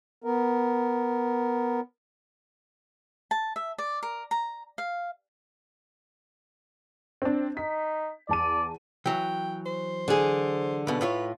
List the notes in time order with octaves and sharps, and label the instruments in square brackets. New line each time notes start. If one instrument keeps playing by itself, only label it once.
[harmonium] B3 A#4
[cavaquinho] A5
E5
D5
A#4
A#5
F5
[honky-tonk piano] C4 D4
[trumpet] D#4 [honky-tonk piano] B6
[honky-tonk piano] E2 A5 D#7 [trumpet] D5
[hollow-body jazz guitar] E3 F#3 [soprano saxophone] G5
[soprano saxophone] C5
[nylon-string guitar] D3 G#4
[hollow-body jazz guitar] B1 B2 [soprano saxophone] B4
[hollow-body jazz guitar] A2 F4 C#5